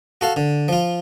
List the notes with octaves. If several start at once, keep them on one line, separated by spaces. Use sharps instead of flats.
F#4 A4 F5
D3
F3 F4